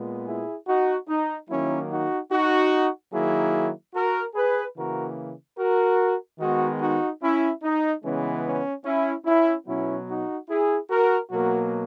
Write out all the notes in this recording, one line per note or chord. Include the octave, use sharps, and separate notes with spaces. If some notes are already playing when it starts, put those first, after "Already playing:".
Already playing: A#2 G#3 B3
E4 G#4
D#4 F#4
D#4
D#3 F#3 A#3 C#4 E4
D#4 F#4
D#4 F#4
D#3 F#3 A#3 E4 G#4
F#4 A#4
G#4 B4
C#3 E3 A#3 F#4 A#4
F#4 A#4
D#3 G#3 B3 D#4 F#4
D#4 F#4
C#4 E4
D#4
C#3 E3 G#3 B3 C#4
C#4
C#4 E4
C#4 E4
B2 F#3 B3 C#4 E4
D#4 F#4
E4 G#4
F#4 A#4
B2 F#3 A#3 F#4 A#4